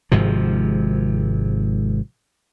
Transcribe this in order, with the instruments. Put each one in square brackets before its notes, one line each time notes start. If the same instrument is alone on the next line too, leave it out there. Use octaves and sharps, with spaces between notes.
[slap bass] G#1 G#2 C3 F3